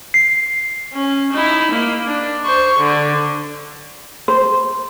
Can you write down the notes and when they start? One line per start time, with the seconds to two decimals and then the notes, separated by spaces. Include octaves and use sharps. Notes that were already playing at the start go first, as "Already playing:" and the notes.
0.14 C7
0.93 C#4
1.32 D#4 E4
1.71 A#3
2.07 D4
2.45 C5 C#6
2.78 D3
4.28 C5